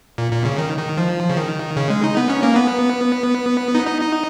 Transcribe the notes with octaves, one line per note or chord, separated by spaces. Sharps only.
A#2
A#2
C#3
D#3
D#3
F3
C#3
D#3
C#3
G#3
D#4
B3
C#4
A#3
B3
D#4
D#4
D#4